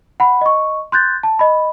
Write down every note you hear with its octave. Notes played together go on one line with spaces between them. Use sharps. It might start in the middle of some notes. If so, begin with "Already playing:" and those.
F#5 B5
D#5 C#6
C6 F#6 G6 A6
A5
D#5 B5